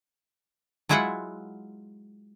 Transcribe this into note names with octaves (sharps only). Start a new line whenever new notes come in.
F#3 G#3 E4 F4 E5 F#5